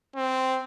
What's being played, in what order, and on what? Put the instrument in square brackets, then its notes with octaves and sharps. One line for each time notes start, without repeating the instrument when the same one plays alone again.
[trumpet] C4